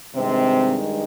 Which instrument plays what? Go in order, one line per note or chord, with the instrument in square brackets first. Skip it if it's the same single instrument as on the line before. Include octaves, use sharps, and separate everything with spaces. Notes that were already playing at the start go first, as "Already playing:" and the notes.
[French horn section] G2 C3 D#3 G#3 C4